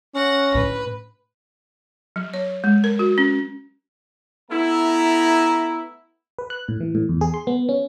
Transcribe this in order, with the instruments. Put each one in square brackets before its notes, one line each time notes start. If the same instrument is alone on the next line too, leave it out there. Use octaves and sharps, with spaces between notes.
[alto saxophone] C#4 [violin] F#5 A#6
[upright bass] A2 D3 [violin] B4
[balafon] F#3
C#5
G#3
A#4
F#4
C#4
[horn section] A3 B3 E4 [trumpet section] A#5
[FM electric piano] B4
F#6
A2
E3
A2
E2
G#4
C6
B3
C#4